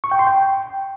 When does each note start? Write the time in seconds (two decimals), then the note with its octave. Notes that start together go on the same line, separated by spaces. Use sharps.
0.04 C#6
0.11 G5
0.19 C6
0.27 G5